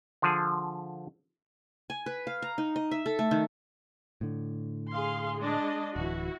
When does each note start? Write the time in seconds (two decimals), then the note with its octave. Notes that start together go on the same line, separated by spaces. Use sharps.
0.22 D3 F3 G#4
1.90 G#5
2.06 B4
2.27 F5
2.42 A#5
2.58 D#4
2.76 D#5
2.91 E5
3.06 A4
3.19 A3
3.31 D#3
4.21 A2 D3
4.92 G#4 F5 C6
5.38 G#3 D4 D#5
5.96 D1 E3 E4 F#4